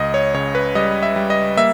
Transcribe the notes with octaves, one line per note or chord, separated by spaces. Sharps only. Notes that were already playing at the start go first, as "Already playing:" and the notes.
Already playing: C#2 D#5
C#5
C#3 C#5
B4
G3 D#5
E5
G3
D#5
A#3 E5